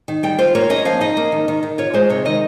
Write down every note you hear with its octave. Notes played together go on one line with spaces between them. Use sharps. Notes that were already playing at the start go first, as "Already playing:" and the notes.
D#3
G3 G5
F4 C5
A#3 C#5
C#4 D#5
F3 F5
D#4 D#5
A#3
D#3
D#3
D#3
F4 C#5
G#3 C5
C3 C#5
D#3 D#5